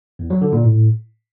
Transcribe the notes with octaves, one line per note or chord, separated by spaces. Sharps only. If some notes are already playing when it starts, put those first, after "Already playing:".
E2
F#3
D3
A#2
A2